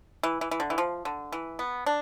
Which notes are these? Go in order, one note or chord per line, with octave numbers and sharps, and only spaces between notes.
E3
E3
E3
D3
E3
F3
D3
E3
B3
D4